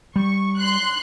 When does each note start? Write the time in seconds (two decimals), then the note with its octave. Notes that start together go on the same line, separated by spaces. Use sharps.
0.16 G3 C#6
0.58 C6 F#6